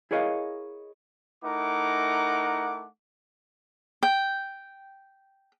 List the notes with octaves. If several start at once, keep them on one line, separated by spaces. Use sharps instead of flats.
E4 G#4 A#4 C#5 D#5 F5
A3 D#4 E4 A#4 F#5 D6
G5